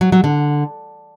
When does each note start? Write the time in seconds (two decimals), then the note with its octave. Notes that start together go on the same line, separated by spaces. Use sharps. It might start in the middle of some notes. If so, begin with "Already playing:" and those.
0.01 F#3
0.12 F#3
0.24 D3